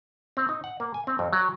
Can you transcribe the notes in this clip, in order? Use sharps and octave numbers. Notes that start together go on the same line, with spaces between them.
C4
D#4
F#5
A#3
G#5
C4
F2
F#3